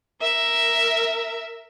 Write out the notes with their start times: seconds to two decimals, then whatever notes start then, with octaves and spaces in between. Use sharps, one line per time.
0.21 A#4 E5